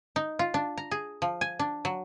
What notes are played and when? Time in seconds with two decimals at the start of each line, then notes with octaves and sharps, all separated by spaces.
0.16 D#4
0.39 F4
0.54 D4
0.77 A#5
0.91 G#4
1.22 F3
1.41 G#5
1.59 D4
1.85 F#3